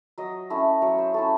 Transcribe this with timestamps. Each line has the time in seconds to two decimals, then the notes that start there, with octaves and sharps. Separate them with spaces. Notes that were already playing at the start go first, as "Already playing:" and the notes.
0.18 F#3 D#5
0.50 A3 C#4 E4
0.82 F#3 C#5
0.98 C5
1.14 A3 C#4 E4 A4